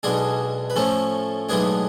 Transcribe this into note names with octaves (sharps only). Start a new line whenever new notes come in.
B1 B2 G#3 D4 G#4
B4
A2 F3 A3 C#4 A4
B1 A2 G#3 B3 D4 G#4